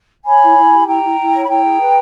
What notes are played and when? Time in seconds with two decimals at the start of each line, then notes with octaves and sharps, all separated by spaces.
0.25 C#5 G#5 B5
0.42 E4
0.57 E4
0.71 G4
0.86 E4 G5 A#5
1.03 E4
1.18 E4
1.33 C#5
1.42 B5
1.48 E4 G5 A#5
1.63 G#4
1.79 B4